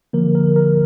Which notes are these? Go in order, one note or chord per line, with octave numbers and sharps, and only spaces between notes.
D3 F3 A#3 A#4
A#4
A#4